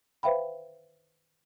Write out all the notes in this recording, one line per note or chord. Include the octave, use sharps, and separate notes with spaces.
B4 C5 E5 F5 G5 B5